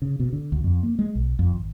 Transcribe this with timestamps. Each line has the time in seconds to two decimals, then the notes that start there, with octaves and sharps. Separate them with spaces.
0.02 C#3
0.20 B2
0.33 D3
0.52 D2
0.64 F2
0.83 A#3
0.99 G#3
1.15 B1
1.39 F2
1.52 G#1